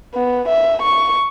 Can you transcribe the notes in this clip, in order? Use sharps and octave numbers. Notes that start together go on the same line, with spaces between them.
B3
E5
C#6